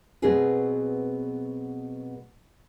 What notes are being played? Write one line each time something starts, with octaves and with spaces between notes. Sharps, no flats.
B2 F#3 B3 C4 G#4 B4